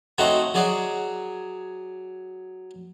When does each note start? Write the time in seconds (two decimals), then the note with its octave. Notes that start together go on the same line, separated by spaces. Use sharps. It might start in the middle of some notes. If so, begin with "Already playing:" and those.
0.18 A3 C4 D#4 F#4 C#5 F#5
0.54 F#3 G#4 D5 F#5